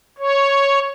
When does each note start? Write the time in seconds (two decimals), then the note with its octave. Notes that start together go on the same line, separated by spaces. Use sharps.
0.19 C#5